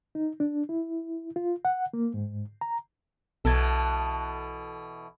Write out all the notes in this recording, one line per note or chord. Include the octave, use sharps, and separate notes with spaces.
D#4
D4
E4
F4
F#5
A#3
G#2
A#5
B1 B2 E3 A4 G#6